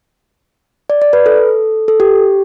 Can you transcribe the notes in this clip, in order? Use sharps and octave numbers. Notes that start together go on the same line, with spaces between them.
D5
D5
B4
A4
A4
G4